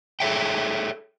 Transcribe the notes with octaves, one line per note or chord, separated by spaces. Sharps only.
G#4 A4 C5 C#5 E5 G5